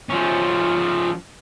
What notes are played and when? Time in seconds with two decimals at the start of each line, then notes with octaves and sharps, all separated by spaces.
0.09 F3 C#4